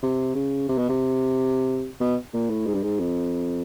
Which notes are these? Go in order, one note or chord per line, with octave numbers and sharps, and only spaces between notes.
C3
C#3
C3
B2
C3
B2
A#2
A2
G#2
G2
G#2
F2